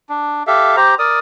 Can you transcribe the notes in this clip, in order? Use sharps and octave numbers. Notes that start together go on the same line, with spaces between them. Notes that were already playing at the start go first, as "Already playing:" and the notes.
D4
G4 A4 E5 F5
G4 C5 A#5
A#4 D5 D#6